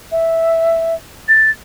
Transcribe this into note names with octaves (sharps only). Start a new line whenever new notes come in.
E5
A6